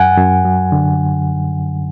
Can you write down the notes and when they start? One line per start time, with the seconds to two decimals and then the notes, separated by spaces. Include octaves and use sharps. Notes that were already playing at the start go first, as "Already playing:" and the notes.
Already playing: F#2 F#5 G#5
0.18 F#2
0.45 F#3
0.72 D3